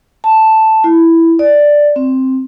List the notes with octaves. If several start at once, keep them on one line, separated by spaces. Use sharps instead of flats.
A5
E4
D5
C4